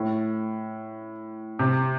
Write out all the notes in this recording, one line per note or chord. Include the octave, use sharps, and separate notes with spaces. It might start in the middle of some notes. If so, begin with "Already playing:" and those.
Already playing: A2
C3